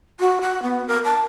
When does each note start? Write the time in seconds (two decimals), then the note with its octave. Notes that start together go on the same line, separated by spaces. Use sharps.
0.20 F#4
0.41 F#5
0.63 B3
0.87 A#4
1.05 A5